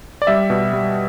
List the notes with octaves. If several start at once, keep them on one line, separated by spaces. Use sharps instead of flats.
D5
G3 E5
B2
G3